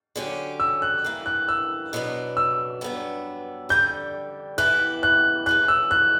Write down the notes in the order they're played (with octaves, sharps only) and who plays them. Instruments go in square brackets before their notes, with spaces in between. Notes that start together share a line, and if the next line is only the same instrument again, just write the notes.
[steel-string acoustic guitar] D3 F#3 C#4 G4
[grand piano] E6
F#6
[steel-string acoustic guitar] G2 E3 A#3
[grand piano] F#6
E6
[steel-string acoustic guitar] B2 F#3 B3 D4
[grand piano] E6
[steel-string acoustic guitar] G2 F#3 B3 D4
[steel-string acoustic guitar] G2 D3 G3 [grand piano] G6
[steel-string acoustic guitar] E3 B3 E4 G4 [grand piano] F#6
[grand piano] F#6
[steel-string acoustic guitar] F#2 C#3 E3 [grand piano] F#6
[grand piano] E6
F#6